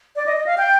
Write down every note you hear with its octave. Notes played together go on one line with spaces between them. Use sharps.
D5
D#5
D#5
F5
G5